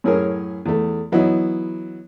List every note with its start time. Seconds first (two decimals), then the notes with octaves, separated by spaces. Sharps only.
0.04 F#2 A2 C#4 G#4 A#4
0.66 E2 A3
1.12 E3 F#3 B3 D#4 E4